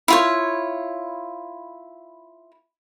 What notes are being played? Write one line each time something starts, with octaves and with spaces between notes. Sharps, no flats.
E4 F4 C#5